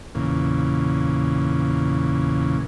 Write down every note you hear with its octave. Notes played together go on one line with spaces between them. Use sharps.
E2 A#2 C#3